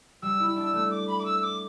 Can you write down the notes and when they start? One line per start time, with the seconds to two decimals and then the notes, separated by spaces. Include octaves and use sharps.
0.22 G3 E6
0.40 E4
0.56 D4
0.73 A3
0.91 D6
1.08 B5
1.19 D6
1.25 E6
1.42 D6